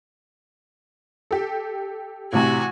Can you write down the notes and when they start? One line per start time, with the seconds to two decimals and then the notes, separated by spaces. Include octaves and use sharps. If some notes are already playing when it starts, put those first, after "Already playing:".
1.31 G4 A4
2.33 A1 C3 F#4 G#5